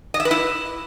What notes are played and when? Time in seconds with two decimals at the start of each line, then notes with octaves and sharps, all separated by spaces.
0.14 D#5
0.20 E5
0.25 B4
0.31 E4